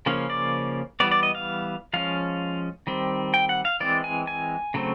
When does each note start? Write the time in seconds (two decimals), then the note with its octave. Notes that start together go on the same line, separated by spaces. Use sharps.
0.06 C#3 F3 A#3 C#4
0.30 D5
1.00 E3 G3 B3 D5
1.11 D5
1.23 D#5
1.35 F5
1.93 F3 G#3 C#4 F5
2.87 D#3 G3 C4
3.34 G5
3.49 F#5
3.65 F5
3.80 E3 G#3 C4 D5
4.04 G#5
4.27 G#5
4.74 C#3 F#3 A3 C4